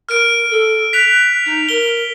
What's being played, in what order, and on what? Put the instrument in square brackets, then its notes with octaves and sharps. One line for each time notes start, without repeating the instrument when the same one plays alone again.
[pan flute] A#4 [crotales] F6 D7
[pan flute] A4
[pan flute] F#6 [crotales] B6 F7
[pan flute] D#4
[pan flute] A#4 [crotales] G7